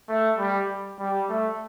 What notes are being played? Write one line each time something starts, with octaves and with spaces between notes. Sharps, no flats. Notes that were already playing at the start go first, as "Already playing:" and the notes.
A3
G3
G3
A3